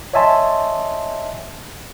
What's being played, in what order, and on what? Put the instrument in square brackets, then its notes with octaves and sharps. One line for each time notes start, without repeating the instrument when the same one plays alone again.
[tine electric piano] C#5 D#5 E5 G#5 A5 C6